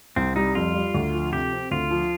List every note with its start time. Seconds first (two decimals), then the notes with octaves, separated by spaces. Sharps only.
0.16 C2 C4
0.36 G3 D#4
0.55 F2 F4
0.74 G3
0.94 D2
1.14 F3
1.32 C3 G4
1.53 C4
1.71 D2 F4
1.91 F3